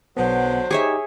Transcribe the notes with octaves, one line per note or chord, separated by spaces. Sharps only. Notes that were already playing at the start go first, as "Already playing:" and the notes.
B1 D3 F#3 B3 C5
D#4 G4 G#4 C#5 E5